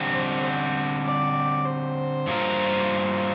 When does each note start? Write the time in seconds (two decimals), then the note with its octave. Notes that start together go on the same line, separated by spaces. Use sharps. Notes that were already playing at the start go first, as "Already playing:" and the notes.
Already playing: D3 G3 C4
0.12 C5
1.04 D5
1.65 C5
2.27 G2 F3 A#3 F4 A#4